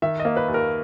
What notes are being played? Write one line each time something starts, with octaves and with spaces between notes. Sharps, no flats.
D#3 E5
D#5
A#3
B4
D#2
A#4